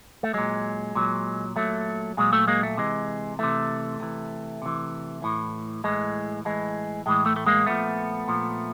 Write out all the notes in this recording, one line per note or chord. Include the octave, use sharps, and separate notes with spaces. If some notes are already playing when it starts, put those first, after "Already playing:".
A3
A#2 F#3 G#3
A#2 F#3
A#2 F#3 A3
A#2 F#3 G#3
A3
G#3 A#3
A3
C3 E3 G#3
C3 E3 A3
C3 E3
C3 E3
A2 E3
A2 E3 G#3
A2 E3 G#3
A2 E3 G#3
A3
A3
G#3 A#3
A#2 F3 A3 B3
A#2 F3